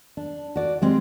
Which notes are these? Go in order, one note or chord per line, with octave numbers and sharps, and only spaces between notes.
D4
F#4 D5
G3 G#3 C4